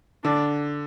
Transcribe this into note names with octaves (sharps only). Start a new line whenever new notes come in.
D3 D4